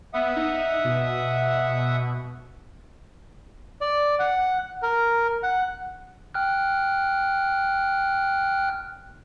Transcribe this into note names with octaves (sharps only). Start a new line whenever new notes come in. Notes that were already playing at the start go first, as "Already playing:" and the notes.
B3 E5 F#5 D#6
D#4
B2
D5
F#5
A#4
F#5
G5 F6 F#6